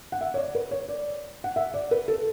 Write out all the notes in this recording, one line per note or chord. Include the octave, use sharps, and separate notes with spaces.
F#5
E5
C#5
D5
B4
C#5
D5
F#5
E5
D5
B4
A4